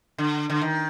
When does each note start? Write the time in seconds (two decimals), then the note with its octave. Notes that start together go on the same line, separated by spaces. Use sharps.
0.18 D3
0.50 D3
0.61 D#3